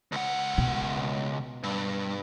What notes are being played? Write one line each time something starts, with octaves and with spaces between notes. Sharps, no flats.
C#2 F#5
B2
G2